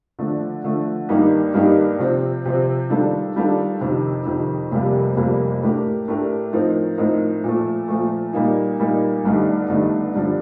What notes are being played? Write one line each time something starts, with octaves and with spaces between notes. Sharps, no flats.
D3 F3 A3
D3 F3 A3
G2 D#3 A#3 D#4 G4
G2 D#3 A#3 D#4 G4
C3 F3 C4
C3 F3 C4
D#3 G3 D4 F4 A4
D#3 G3 D4 F4 A4
F2 C3 D#3
F2 C3 D#3
F1 F2 C3 G3 A#3
F1 F2 C3 G3 A#3
A2 A3 D4 G4 A#4
A2 A3 D4 G4 A#4
A2 F3 C4 D#4 A#4
A2 F3 C4 D#4 A#4
A#2 F3 A3
A#2 F3 A3
A#2 G3 A#3 D#4
A#2 G3 A#3 D#4
G1 G2 D3 A3 D#4
G1 G2 D3 A3 D#4
G2 D3 F3